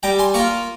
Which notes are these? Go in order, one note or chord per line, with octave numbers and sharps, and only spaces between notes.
G3 G5 A#5
G#5 C6
A#3 F4 A#5 C#6